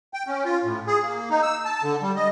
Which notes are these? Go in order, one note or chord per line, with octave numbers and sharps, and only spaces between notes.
G5
C#4
F4
A2
G#4
A#3
D#4
E6
A5
D3
G3
D#5